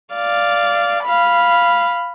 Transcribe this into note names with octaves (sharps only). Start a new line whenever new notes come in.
D5 F5
F5 B5